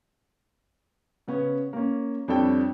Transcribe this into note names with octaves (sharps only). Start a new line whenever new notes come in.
C#3 B3 C#4
A#3 C#4
F2 G3 D4 A4 C#5 G5